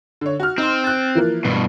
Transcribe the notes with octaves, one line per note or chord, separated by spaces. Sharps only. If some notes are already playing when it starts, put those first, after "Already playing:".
D3 C#5
F#4 F6
C4 D#4 C6
F#6 A6
E3 F3 A#3
G2 B2